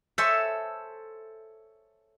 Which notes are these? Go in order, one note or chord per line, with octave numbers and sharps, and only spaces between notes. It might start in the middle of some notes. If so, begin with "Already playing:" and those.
A4 C5 C#5 E5 G#5